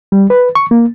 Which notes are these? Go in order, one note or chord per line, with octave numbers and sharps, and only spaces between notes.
G3
B4
C#6
A#3